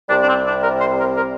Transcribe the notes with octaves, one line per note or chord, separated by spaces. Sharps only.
C2 C3 G3 D4
D4
C4
D4
A#4
C5
A#4
A#4